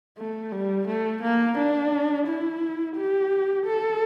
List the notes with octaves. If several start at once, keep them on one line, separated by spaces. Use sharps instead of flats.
A3
G3
A3
A#3
D4
E4
G4
A4